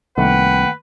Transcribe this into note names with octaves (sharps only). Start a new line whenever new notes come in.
C2 D#3 A3 A#3 B4 F#5 G5